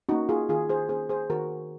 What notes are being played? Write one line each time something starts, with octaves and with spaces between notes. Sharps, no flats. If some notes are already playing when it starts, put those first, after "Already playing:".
A#3 C#4 D#4 F#4
F4 G#4
D#3 F4 G#4
G#4 C5
A#3 C#4 G#4 C5
G#4 C5
D#3 F#4 A#4